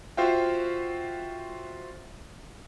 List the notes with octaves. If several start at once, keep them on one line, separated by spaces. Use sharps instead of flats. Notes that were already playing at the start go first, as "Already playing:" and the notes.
F4 F#4 C5 E5 F5 G5